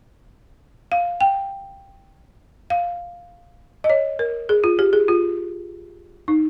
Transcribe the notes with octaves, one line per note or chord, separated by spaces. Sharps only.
F5
G5
F5
D#5
C#5
A#4
G#4
F4
G4
G#4
F4
D#4